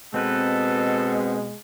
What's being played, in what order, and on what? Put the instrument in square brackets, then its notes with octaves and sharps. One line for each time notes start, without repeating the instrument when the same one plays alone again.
[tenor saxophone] B2 [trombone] G#3 [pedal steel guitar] C4 B4 [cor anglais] A4